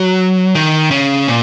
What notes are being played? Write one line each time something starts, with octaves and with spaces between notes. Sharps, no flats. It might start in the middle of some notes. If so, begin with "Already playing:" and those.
Already playing: F#3
D#3
C#3
A#2